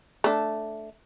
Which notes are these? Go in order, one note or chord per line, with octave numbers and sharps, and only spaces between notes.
A3 D4